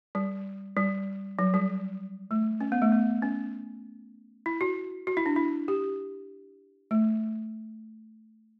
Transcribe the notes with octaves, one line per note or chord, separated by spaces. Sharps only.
G3
G3
F#3
G3
A3
C#4
B3
A3
B3
C#4
E4
F#4
F#4
E4
D4
E4
G4
A3